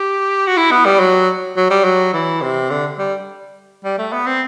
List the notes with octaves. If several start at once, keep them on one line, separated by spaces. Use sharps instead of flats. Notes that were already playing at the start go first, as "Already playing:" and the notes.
Already playing: G4
F#4
E4
B3
G3
F#3
F#3
G3
F#3
E3
C3
D3
G3
G3
A3
B3
C4